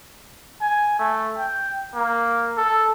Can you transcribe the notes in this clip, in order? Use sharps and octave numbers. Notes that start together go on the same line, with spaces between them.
G#5
A3
G5
A#3
A4